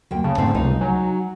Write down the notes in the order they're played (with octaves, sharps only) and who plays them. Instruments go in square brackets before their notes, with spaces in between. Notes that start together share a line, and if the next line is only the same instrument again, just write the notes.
[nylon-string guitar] D2 G5 [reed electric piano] F#3 A#3
[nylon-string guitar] D2 [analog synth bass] C#3 [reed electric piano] A5
[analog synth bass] G#2 [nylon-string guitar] D3 A3 C4
[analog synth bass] C#2 [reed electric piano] C3 G3 G#3 [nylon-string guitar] D#4
[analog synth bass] F#3 [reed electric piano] G#5 A#5